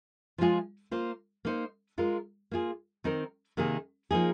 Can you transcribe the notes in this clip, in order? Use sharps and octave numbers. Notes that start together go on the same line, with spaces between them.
F3 G#3 F4 G#4
A#3 F4 C5
A#3 D#4 C5
G#3 F4 A#4
A#3 F4 G#4
D#3 C4 D#4 A#4
C3 D#3 A#3 G#4
F3 A#3 D#4 G#4